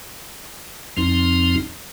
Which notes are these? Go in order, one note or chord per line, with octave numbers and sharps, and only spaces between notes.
F2 F3 C4 D#4